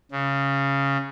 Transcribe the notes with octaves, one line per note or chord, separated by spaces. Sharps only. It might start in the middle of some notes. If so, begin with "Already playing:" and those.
C#3